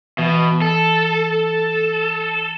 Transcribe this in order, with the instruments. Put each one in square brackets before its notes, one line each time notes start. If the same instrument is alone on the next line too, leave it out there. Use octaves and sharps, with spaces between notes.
[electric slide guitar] B2 [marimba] E3
[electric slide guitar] A4